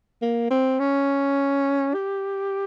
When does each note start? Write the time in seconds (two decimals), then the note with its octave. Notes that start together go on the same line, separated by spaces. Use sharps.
0.22 A#3
0.50 C4
0.79 C#4
1.94 G4